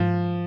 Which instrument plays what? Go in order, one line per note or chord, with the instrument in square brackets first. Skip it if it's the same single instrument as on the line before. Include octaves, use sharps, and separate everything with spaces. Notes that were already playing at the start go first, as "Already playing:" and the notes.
Already playing: [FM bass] G#2 [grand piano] F3